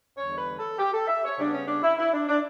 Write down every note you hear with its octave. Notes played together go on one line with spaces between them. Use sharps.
E2 D3 G3 C#5
B4
A4
G4
A4
E5
C#5
C#3 G3 B3 D4
C#4
D4
E4
E4
D4
D4